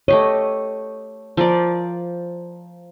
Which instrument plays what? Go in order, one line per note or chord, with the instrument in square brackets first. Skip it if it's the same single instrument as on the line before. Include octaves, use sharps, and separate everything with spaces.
[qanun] A3 G4 D#5 [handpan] C#5
[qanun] F3 A#4 D5